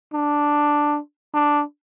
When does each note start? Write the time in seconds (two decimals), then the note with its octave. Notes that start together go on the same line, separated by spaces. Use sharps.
0.13 D4
1.34 D4